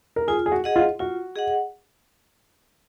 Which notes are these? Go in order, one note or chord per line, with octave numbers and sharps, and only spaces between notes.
A#4
F4 G#4
G#4
F#4
G#4 D#5 F#5
F4
F4 F#4
G#4 D#5 F#5